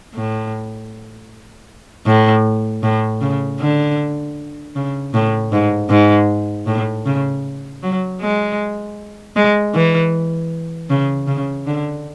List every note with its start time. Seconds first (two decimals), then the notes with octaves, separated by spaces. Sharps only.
0.14 A2
2.06 A2
2.83 A2
3.21 C#3
3.60 D3
4.75 C#3
5.14 A2
5.52 G#2
5.90 G#2
6.67 A2
7.05 C#3
7.83 F#3
8.21 G#3
9.36 G#3
9.74 E3
10.90 C#3
11.27 C#3
11.66 D3